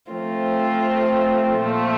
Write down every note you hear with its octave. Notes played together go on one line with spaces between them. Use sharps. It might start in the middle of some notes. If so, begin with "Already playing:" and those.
F3 A3 C4 F4
A#2 F3 A3